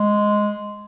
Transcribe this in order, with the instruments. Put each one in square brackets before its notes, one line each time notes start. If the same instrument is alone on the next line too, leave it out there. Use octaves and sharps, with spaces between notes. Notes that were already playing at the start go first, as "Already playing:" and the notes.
Already playing: [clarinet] G#3